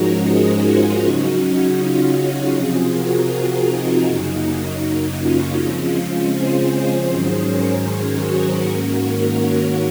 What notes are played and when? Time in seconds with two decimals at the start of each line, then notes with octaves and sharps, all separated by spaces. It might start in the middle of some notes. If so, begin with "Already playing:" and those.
Already playing: G#2 F3 G#3 C#4 D#4 F#4 A#4 C#5
0.28 G#4 C5
0.66 F4 G#4
1.03 C#3 F#3 C#4 D#4 F#4
1.79 C#4 F4
2.18 F4 G#4
2.54 C3 F3 C4
2.92 F#4 A#4
3.68 D#4
4.06 F#2 C#3 F#3 A#3
4.44 D#4
5.19 C#4 F4
5.56 C#3 F3 G#3 C4 C#4 F4
6.32 G#4 C5
6.70 G#4 C5
7.07 G#2 D#3 F#3 C#4 G#4 C5
7.46 A#4 C#5
7.83 G#4 C5
8.21 F#4 A#4
8.59 G#2 D#3 A#3 C#4
8.96 F#4 A#4
9.35 A#4 C#5